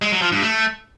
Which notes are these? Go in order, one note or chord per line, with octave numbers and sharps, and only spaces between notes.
G#3
F#3
F3
G2
A3